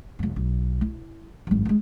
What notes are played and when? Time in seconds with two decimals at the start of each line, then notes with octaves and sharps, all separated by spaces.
0.19 C2 F2
0.36 B1
0.81 E4
1.47 G#1 F#2
1.65 F3 G#3